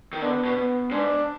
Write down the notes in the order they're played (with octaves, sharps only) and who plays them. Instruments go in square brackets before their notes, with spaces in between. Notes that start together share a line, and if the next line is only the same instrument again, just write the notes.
[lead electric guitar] D#3
[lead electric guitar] D3 [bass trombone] B3
[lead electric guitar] B2
[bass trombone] B3
[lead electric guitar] G#2 [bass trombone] D4